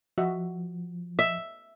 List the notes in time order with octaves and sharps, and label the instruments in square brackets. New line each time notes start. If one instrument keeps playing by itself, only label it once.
[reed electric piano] F3 [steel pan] F#4 D#5 E5
[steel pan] D#5 [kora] E5